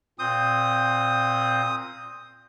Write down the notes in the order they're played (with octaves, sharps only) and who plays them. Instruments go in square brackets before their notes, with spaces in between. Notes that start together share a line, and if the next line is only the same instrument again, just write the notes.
[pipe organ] A#2 C4 G6 [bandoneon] D#6